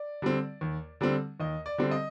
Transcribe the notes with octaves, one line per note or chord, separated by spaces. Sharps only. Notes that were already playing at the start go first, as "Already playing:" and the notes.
Already playing: D5
D3 G3 C4
D#2
D3 G3 C4
D#2 D#5
D5
D3 G3 C4
D#5